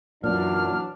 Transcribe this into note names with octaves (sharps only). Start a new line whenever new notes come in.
F#2 A#2 E3 F#3 D4 F6